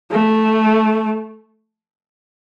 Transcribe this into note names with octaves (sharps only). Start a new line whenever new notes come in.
A3